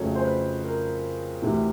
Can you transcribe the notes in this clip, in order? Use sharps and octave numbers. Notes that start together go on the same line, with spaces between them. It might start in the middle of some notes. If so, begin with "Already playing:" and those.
Already playing: F2 C#3 F#3 A3 C#5
C5
B4
A#4
D2 C3 E3